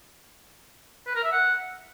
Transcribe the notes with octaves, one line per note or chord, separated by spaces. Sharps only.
B4
A#4
E5
F#5